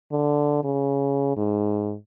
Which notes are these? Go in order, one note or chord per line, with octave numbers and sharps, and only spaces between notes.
D3
C#3
G#2